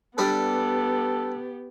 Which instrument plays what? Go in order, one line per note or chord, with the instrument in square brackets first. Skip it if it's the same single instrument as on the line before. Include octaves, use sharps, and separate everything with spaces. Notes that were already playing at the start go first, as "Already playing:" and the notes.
[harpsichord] G3 D4 B4 [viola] B3 G4 [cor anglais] A4